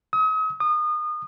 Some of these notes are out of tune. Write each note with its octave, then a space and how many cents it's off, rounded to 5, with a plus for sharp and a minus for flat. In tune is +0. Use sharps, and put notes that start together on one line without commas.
D#6 +40
D#6 -30